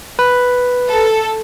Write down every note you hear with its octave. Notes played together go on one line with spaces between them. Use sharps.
B4
A4